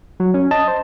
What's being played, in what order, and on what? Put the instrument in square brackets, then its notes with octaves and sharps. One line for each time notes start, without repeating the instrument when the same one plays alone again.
[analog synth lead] F#3
C#4
[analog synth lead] D#5 [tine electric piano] A5
[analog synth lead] C5